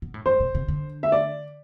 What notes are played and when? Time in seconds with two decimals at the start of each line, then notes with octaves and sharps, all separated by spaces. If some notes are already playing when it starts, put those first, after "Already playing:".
0.02 B2
0.14 A2
0.26 G2 C5
0.40 B2
0.55 C3
0.68 D3
1.03 E5
1.12 D5